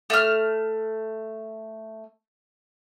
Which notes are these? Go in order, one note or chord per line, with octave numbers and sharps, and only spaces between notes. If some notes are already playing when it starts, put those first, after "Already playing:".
A3 F6